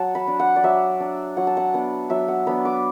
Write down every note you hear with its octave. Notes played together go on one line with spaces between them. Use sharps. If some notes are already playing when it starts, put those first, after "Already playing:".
Already playing: F#3 F#5 A5
B5
D4
F#5
D5
F#3 E5
D4
F#3 F#5
A5
F#5
B3 D4
F#3 E5
F#5
B3 D4 B5
D6